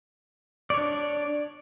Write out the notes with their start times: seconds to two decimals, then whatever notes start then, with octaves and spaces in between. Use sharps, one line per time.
0.70 D5
0.74 C#5
0.77 D4